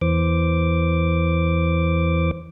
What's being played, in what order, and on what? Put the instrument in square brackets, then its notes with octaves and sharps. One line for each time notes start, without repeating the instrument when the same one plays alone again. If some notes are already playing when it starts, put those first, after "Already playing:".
[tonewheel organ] E2 E3 C5 D6